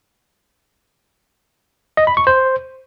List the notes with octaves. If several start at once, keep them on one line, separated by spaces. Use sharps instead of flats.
D#5
B5
C#6
C5